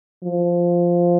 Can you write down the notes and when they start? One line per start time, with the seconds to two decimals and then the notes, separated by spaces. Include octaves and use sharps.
0.24 F3